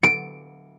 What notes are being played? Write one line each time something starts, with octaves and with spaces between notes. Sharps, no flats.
D7